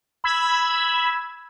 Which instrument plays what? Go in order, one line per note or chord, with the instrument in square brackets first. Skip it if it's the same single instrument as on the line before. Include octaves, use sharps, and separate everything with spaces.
[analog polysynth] B5 E6 G#6